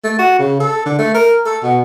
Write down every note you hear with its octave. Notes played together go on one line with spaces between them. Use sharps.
A3
F#4
C#3
A4
D3
A3
A#4
A4
B2